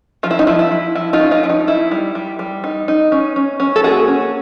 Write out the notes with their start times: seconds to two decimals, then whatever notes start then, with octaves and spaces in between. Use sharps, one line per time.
0.23 F3 F4
0.31 E4
0.39 D#4
0.47 F3 E4
0.59 E4
0.71 F3
0.95 F3 E4
1.13 D#4 F4
1.20 C#4
1.31 D#4 F4
1.43 F3 E4
1.50 D#4
1.67 D#4 E4
1.91 G3
2.15 G3
2.39 G3
2.64 D#4
2.88 D#4
3.12 C#4
3.36 C#4
3.60 C#4
3.76 A4
3.83 A#3 F#4 G#4
4.08 C#4